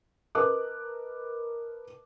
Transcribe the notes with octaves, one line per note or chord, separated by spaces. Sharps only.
A#4 B4 D#5 A5 D6 F#6